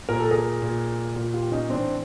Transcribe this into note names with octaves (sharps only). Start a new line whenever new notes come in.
A#2 A#4
A4
G#4 A#4
A#2
A#2
F4 G4
C#4 D#4
A2 E3 C4 D4